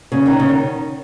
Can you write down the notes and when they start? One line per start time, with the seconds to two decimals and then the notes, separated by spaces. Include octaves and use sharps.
0.12 C#3
0.26 D#3
0.40 C#3
0.49 D#3